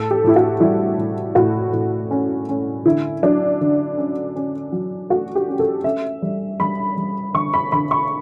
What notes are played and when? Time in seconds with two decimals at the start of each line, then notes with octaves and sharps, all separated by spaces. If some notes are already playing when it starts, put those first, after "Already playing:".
Already playing: A2 A4
0.11 G4
0.24 A2 E4
0.36 F#4
0.60 G3 E4
0.98 A2
1.35 A2 F#4
1.73 A2
2.11 C#4
2.49 C#4
2.86 D3 E4
3.23 F#3 D4
3.61 D3
3.98 C#4
4.36 C#4
4.72 F#3
5.10 A3 F#4
5.35 G4
5.48 C#4
5.59 A4
5.84 C#4 E5
6.22 G3
6.60 G3 B5
6.97 G3
7.34 D3 C#6
7.54 B5
7.72 D3 B5
7.91 C#6